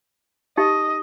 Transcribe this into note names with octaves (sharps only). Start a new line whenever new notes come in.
D#4 G4 D#5